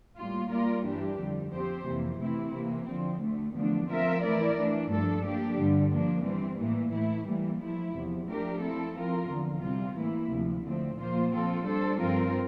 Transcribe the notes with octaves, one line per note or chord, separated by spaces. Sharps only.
A2 G3 A#3 F4
G3 A#3 F4 A#4 D5
G2 E3 G3 D4 G4
F2 D3 G3
F3 C4 G4 C5
F2 C3 E3 A#3
C3 E3 A3 C4 E4
C3 E3 A#3
D3 F3 C4
D2 D3 A3
E2 D3 F3 A3 D4
F3 C4 F4 A#4 E5
E3 A3 E4 A#4 D5
E3 A3 D4
G2 F3 A3 D4 A4
F3 A#3 D4 G4
G2 D3 G3
F3 A#3 D4
E3 G3 C4
A2 E3 A#3
A2 E3 A3 E4
E3 G3 A#3
F3 A3 E4
E2 C3 F3
F3 A3 D4 G4 A#4
F3 C4 E4 A4
F3 C4 F4 A#4
E2 D3 F3
C3 G3 C4 F4
A2 E3 A#3 E4
D2 C3 F3
D3 F3 A3 C4
A#2 F3 A#3 F4 C5
F3 C4 F4 A4
G3 D4 A4 C5
G2 F3 C4 F4 A#4